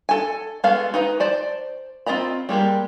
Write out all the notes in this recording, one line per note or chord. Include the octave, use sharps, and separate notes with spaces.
A4 G#5
G#3 B3 F#4 A4 F5
D#4 B4 A#5
C5 D5 A5
C4 F4 D#5 A#5 B5
G3 G#3 A#3 G4